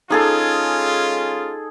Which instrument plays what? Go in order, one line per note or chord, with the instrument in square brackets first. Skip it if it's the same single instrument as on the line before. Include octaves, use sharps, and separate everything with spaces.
[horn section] G#3 C#4 F4 [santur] D#4 G#4 A4